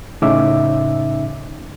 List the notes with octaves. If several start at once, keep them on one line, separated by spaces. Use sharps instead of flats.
A2 C#3 C#4 D#4 E5 D6